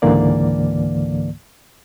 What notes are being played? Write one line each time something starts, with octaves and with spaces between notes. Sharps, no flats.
C#2 G#2 D3 E3 A#3 D5